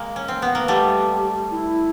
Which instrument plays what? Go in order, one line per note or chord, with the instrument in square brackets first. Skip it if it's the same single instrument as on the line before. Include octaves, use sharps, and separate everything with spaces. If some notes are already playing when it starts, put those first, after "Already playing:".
Already playing: [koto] G#3 A#3
C#4
C4
B3
A#3
[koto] G3 A3 [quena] G4
[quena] E4